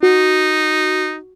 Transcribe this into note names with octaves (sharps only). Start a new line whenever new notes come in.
D#4 F#4